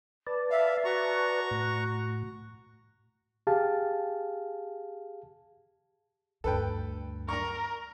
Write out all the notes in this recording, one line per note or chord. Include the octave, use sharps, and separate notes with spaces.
B4 D5 A5
E5 F5
F#4 A#5 C#6
A2
G4 G#4 F5 A5
D2 G2 A4 B4 G5
A#4 A#5 C#6